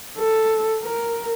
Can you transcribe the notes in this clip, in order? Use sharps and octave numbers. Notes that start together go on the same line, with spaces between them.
A4
A#4